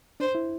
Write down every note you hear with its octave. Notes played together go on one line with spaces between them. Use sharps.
D4 C5
E4